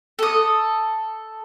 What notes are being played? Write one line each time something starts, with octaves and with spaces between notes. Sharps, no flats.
A4 D#6